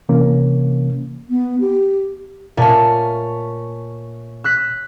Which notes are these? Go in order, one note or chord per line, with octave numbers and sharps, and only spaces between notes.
C3 E3 A#3 C#4
B3
G4
A#2 A3 C#4
E6 F#6 B6